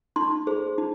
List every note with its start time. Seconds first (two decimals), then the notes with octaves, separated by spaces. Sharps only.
0.16 D#4 C6
0.47 G#4 C5
0.78 D#4